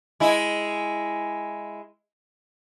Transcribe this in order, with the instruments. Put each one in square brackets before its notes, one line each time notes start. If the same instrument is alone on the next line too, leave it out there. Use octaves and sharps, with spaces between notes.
[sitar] G#3 E4